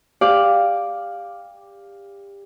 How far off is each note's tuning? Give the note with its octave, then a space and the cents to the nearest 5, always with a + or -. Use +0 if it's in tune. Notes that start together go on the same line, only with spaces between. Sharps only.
G4 +25 D5 +0 F5 +5